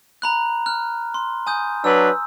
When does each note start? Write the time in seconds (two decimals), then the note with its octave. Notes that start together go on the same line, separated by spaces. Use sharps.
0.22 A#5 B5 F#6
0.66 F6 F#6
1.14 C6
1.47 G#5 D#6 G6
1.84 F#3 D4 B4 E6